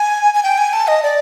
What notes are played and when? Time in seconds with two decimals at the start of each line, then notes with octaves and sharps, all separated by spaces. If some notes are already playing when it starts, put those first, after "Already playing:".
Already playing: G#5
0.34 G#5
0.43 G5
0.58 G#5
0.73 A5
0.88 D#5
1.03 D5